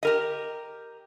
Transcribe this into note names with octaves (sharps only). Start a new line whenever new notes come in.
G4 A#4 D#5